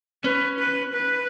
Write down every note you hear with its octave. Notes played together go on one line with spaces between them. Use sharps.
C#4 B4
B4
B4